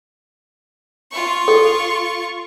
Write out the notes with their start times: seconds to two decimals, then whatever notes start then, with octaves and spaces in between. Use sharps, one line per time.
1.12 F4 C#6
1.48 A4